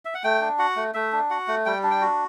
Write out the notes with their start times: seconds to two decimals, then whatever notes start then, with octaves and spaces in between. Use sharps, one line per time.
0.05 E5
0.14 F#5
0.24 A3 G5
0.41 D4
0.58 F#4 F#5
0.76 A3
0.94 A3 E5
1.12 D4
1.30 F#4 F#5
1.48 A3
1.66 G3 G5
1.83 D4
1.91 G5
2.01 F#4